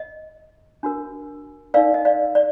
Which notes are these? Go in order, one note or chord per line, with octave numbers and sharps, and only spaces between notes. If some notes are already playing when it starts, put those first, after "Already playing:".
Already playing: D#5
D4 F#4 A#4
D#4 A#4 D5 F5
D#5
D5 F5
D5